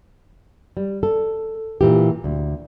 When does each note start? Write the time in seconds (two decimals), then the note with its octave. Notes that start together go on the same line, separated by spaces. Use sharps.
0.77 G3
1.03 A4
1.81 A#2 E3 G4
2.24 D2